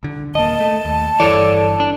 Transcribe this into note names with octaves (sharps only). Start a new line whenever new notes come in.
C2 D3
D#1 A#3 D#5 A5
A3
D#2
G1 G2 E3 A4 C#5 D5
D4